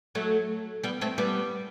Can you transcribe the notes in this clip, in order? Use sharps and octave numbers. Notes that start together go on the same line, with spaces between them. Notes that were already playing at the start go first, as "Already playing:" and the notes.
F#3 A3
G3 B3
A3 C4
G3 B3